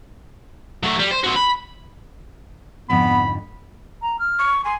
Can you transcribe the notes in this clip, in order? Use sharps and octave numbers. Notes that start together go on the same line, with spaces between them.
F#3 A3
G3
C5
C4 F#4
B5
F2 G#2 D3 B3 B5
A#5
F6
C#6
G#5 C6